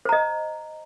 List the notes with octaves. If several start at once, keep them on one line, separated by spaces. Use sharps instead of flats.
C5 D#5 A#5